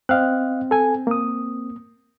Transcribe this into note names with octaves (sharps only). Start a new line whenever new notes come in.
C4 D#5 F5 F#6
A4 G#5
A#3 D#6